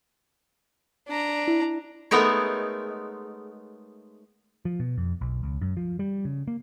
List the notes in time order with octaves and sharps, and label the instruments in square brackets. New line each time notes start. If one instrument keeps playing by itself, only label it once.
[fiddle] D4 A#5
[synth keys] E4
[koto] G#3 A3 B3 D#4 A#4 C#5
[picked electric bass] F3
B2
F2
B1
C#2
F#2
F3
G3
C#3
A#3